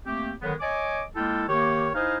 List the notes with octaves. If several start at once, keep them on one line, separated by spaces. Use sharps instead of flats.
A3 A#3 C4 G4
D3 D#3 F#3 G#3 B3
C#5 D#5 G#5 D6
G#3 A#3 E4 F4 A4 G5
D#3 A#3 G4 C#5
D#4 E4 C5 D#5 F5 G#5